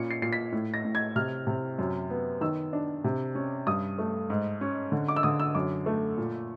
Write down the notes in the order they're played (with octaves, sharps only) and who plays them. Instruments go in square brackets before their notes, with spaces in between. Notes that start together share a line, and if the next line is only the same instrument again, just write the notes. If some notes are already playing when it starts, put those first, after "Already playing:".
Already playing: [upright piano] A#2 C#4 C#7
C7
A#2 C7
B6
A2
A#6
A2
G#6
C3 F6
C3
F#2
B3
D#3 E6
D4
C3
C#4
G2 D#6
A3
G#2
C#4
D3
D6
E6
D3 D#6
E6
F#2 D6
A3
A#2